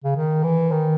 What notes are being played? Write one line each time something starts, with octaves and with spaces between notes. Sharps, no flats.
C#3
D#3
E3
D#3